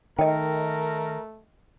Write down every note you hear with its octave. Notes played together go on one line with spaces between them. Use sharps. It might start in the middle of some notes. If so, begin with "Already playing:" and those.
D#3 A3 A#4 D#5 G5